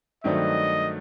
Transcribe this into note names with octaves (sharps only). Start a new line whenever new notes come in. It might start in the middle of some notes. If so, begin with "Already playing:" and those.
G2 D#3 F#3 A3 C4 D#5